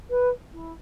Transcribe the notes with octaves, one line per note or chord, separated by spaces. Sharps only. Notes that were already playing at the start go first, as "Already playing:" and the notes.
B4
E4